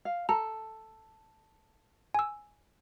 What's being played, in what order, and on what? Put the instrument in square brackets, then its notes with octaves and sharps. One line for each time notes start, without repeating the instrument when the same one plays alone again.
[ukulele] F5
[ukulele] A4 [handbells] A#5
[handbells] G#5 E6